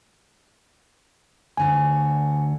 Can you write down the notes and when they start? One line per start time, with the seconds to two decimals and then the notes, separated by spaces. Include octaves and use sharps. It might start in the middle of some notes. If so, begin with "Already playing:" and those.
1.57 D2 D3 F#4 G#5